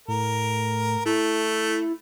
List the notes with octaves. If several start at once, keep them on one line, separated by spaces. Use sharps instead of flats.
A2 A#4
A3 E4